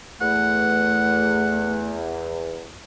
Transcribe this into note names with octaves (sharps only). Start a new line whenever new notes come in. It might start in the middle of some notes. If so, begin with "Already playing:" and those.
E2 A3 F#5